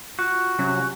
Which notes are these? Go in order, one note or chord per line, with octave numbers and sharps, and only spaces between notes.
F4 F#4
C3 F#3 C#4